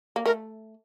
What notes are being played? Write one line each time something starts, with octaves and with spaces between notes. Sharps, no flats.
A#3
A3 A#4